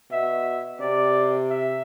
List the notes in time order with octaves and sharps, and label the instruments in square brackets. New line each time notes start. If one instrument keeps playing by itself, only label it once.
[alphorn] B2 [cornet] E5
[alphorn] C3 [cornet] D5
[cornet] E5